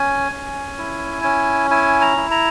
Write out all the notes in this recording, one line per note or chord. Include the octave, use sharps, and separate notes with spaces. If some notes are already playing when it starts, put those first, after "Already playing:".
Already playing: C#4 G#5
C#4
E4
C#4
E4 G#5
A#5
E4
A#5